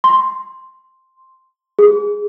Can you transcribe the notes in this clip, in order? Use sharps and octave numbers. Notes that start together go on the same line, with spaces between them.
C6
G#4